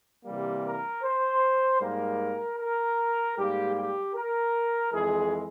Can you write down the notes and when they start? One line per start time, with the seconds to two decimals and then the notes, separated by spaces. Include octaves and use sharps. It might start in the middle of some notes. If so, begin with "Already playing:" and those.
0.25 C3 E3 G3 A#3
0.65 A#4
1.03 C5
1.81 G#2 G3 A#3 A#4
2.58 A#4
3.37 G#2 G3 A#3 G4
3.75 G4
4.14 A#4
4.92 F2 E3 G#3 G#4